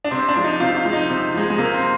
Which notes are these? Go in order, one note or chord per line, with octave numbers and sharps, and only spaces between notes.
D4
C3 C4
D4
F3 G#3
D#4
C3 F4
F4
F3 G#3
D#4
C3
F3 G#3
G#3
C3 A#3
C4